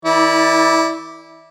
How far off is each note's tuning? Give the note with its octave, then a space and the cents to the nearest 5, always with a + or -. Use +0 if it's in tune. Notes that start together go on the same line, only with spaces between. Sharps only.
E3 -45 E4 -15 D5 +0